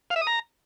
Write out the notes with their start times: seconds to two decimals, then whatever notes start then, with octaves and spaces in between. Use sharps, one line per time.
0.10 F5
0.16 E5
0.21 D#6
0.27 A#5